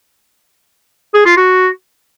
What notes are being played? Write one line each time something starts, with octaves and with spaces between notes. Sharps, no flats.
G#4
F4
F#4